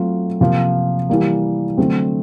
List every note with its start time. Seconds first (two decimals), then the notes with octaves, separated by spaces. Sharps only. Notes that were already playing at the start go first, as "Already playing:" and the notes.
Already playing: F#3 A3 C4 F4
0.41 C3 F3 A#3
1.10 E3 G3 A#3
1.78 D3 F#3 A3 C4